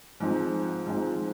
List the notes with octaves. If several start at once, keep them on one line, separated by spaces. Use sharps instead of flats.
G#2 F3 C4
G#2 F3 C4